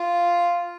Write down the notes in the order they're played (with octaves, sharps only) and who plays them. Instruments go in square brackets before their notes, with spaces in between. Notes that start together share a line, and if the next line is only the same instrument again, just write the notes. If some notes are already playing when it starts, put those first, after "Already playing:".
Already playing: [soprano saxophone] F4